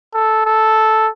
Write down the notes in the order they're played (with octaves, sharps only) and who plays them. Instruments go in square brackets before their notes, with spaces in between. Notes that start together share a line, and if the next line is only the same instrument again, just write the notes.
[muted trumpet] A4
A4